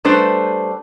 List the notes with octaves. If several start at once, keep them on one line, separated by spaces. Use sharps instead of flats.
G3 A3 D4 G4 B4 C5